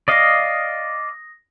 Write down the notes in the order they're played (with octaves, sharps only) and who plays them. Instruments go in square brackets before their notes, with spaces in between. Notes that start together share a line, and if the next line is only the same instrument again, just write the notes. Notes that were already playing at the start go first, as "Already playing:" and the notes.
[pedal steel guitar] D5 D#5 F5 [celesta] D#6 A#6